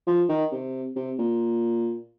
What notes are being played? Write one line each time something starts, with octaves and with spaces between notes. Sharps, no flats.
F3
D#3
C3
C3
A#2